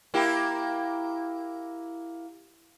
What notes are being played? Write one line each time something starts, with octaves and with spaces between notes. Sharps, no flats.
A#3 E4 G4